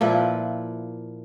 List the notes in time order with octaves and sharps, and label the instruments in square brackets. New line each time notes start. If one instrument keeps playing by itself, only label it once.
[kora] A#2 F3 E4 B4